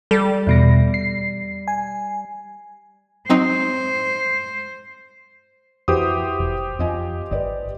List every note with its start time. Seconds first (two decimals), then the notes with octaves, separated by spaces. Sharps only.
0.11 G3 A4
0.47 E2 B2 A#6
0.94 C7
1.68 G#5
3.29 F#3 C4 D#4 C5
5.88 F2 E4 F#4 G4 B4 C5 D#6
6.39 F1
6.79 F2 F4 D#5 G#5
7.31 G#1 B4 D5 D#5